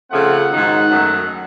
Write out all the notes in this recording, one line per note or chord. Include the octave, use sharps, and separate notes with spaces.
C#3 F3 A3 C4 F#5
G#2 D#3 F#3
F#2 D#3 F#3 A3